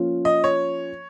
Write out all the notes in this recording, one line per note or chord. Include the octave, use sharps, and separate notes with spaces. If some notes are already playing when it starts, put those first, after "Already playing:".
Already playing: F3 A#3 C#4 F4
D#5
C#5